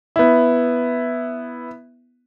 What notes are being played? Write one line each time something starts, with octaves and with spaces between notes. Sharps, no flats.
B3 E4